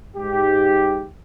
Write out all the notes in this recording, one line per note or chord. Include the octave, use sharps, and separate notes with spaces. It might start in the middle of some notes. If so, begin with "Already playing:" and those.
G#2 G4